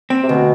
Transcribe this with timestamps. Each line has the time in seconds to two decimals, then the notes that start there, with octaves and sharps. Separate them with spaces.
0.10 C4
0.23 C3
0.29 D2 B2